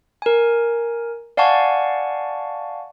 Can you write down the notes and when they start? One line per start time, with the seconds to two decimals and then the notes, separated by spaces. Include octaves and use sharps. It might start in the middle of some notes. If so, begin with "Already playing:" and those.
0.22 A#4 G#5
1.37 D5 F5 F#5 G#5 A5 C#6